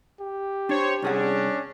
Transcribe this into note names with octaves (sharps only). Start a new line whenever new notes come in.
G4
D4 C5 C#5
C2 C#4 D4 G#4 F#5